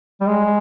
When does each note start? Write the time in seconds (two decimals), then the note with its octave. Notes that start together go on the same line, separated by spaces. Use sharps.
0.21 G3
0.27 G#3